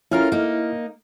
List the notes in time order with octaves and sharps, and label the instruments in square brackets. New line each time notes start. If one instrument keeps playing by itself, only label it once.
[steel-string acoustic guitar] C#4 F4 A#4 [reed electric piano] E4 F6
[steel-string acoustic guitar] A#3 D#4